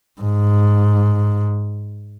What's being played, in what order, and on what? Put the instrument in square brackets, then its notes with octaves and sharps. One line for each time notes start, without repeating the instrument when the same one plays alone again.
[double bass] G#2